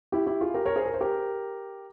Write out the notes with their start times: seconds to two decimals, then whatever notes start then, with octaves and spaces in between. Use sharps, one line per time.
0.12 E4 G4
0.26 E4 G4
0.41 F4 G#4
0.54 G4 A#4
0.65 A#4 C#5
0.76 G#4 C5
0.86 A#4
0.94 C5
1.01 G4 A#4